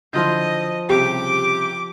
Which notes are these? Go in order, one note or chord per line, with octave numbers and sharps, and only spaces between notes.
D3 F3 E4 F4 D#5 G6
C2 C#3 C4 G4 D6